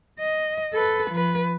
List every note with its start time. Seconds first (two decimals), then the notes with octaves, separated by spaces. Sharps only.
0.20 D#5
0.73 A4 B4
1.11 F3 B4